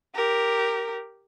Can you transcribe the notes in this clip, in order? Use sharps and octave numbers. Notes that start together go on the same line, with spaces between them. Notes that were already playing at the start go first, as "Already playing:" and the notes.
G4 A#4